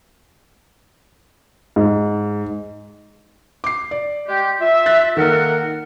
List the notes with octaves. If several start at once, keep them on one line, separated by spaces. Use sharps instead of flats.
G#2
D6 C7
D5
G#3 G4
F4 E5
F#6 A6
D#3 A#3 A4 A#4 F#5